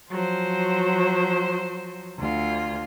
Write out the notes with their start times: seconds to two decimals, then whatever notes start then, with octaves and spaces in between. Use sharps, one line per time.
0.10 F3 F#3 C5
2.18 D2 F4